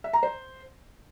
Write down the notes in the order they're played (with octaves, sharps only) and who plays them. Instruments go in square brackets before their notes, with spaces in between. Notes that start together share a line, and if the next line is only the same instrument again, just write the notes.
[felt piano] E5
A#5
C5